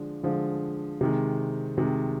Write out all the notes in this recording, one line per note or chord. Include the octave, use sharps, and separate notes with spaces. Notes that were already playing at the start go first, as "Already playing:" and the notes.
Already playing: D3 F3 G#3 D4
D3 F3 G#3 D4
C3 D#3 G#3
C3 D#3 G#3